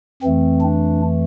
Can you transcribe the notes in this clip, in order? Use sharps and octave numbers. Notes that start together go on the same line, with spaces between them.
F2 E3 A3 C4
D4